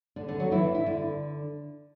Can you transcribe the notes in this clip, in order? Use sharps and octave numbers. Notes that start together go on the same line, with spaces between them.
D3 D4
D3 D4
F#3 F#4
E3 E4
D4
E4
D3 D4